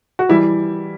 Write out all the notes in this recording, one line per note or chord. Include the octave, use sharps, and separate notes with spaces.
F#4
E3 G3 E4